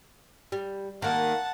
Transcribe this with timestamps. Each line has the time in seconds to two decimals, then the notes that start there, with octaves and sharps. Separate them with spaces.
0.52 G3
1.02 D#3 A#3 F#5 A5